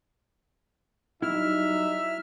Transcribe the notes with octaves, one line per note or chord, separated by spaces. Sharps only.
F#3 G3 D#4 E4 E5 F6